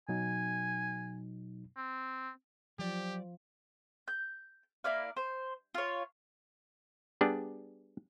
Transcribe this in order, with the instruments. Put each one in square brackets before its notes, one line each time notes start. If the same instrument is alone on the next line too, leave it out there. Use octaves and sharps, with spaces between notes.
[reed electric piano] B2 F#3 D#4 [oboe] G#5
[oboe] C4
[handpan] F3 [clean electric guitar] F#3 D5 [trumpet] G4
[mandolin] G6
A#3 E4 D5 F5
C5
F4 C#5
[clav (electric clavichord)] G3 B3 D4 G#4